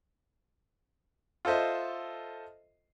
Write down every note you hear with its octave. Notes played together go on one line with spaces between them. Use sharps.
F4 A4 C5 D#5 E5